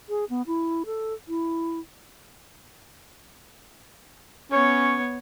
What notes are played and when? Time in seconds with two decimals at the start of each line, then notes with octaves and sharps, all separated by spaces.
0.09 G#4
0.30 B3
0.47 E4
0.86 A4
1.28 E4
4.51 B3 C#4 C#5